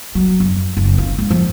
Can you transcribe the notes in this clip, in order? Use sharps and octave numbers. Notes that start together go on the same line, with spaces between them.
F#3
F#2
F#1
F4
G#3
F3